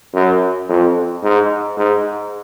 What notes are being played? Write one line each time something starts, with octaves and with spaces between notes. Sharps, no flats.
F#2
F2
G#2
G#2